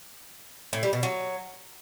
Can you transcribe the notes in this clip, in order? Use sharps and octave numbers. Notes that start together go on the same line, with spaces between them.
A2
G3
B2
F#3